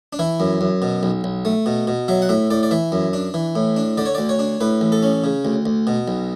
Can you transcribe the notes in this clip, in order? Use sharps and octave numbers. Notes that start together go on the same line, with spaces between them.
D4
E3 E4
F#2
F#2
B2
B1
B1
A3
B2
B2
F#3 E5
F#5
A2 E5
A2 D5
D5
E3 E5
F#2
D4
E3
A2
D4
D3 D5
C#5
D2 D5
C#5
D4
A2 B4
A1
A4
C#4
C#3
D2
D2
B2
B1